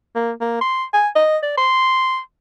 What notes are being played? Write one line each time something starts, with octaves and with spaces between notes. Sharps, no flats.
A#3
A#3
C6
G#5
D#5
D5
C6